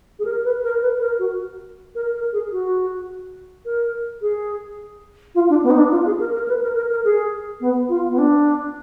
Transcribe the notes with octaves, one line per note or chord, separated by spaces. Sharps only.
G#4
A#4
B4
A#4
B4
A#4
F#4
A#4
A#4
G#4
F#4
A#4
G#4
F4
D4
B3
D#4
D4
F4
G#4
A#4
A#4
B4
A#4
A#4
A#4
G#4
B3
F4
B3
D4